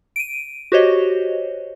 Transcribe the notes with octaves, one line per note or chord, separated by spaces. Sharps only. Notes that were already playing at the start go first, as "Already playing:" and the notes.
D7 D#7
F#4 G4 C5 C#5 D#5